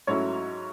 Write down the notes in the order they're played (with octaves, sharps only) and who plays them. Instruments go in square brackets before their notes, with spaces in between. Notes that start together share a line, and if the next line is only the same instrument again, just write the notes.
[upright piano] G#2 F#3 A3 C#4 E4 C#5